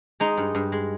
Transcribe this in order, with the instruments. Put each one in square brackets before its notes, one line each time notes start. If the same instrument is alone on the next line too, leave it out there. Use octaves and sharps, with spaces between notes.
[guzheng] G#3 D#4
G2
G2
G#3